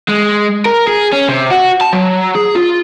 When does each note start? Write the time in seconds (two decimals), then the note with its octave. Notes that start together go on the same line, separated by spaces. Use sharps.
0.09 G#3
0.66 A#4
0.87 G#4
1.13 C#4
1.29 C3
1.51 F#4
1.81 A5
1.93 F#3
2.35 G#4
2.55 F4